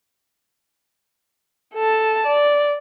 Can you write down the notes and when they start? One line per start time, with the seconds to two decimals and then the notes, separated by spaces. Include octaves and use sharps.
1.75 A4 A5
2.27 D5